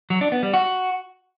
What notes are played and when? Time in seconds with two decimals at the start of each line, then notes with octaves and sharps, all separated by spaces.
0.10 F#3
0.21 D4
0.32 B3
0.43 G3
0.54 F#4